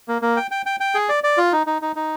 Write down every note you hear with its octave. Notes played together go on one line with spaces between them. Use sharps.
A#3
A#3
G5
G5
G5
G5
G#4
D5
D5
F4
D#4
D#4
D#4
D#4